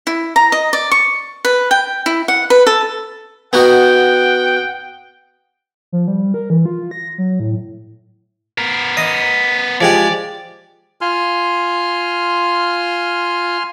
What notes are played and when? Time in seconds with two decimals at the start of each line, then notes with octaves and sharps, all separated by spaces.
0.07 E4
0.36 A#5
0.52 D#5
0.73 D5
0.91 C#6
1.45 B4
1.71 G5
2.06 E4
2.28 F#5
2.50 B4
2.67 A4
3.53 B3 D#4 F#4 F#5 G5
5.92 F3
6.08 G3
6.34 A#4
6.50 E3
6.66 F4
6.91 A#6
7.18 F#3
7.40 A2
8.58 B3 A#4
8.97 D#5
9.81 F3 G#3 G4 D5
11.01 F4 G#5 C6 F6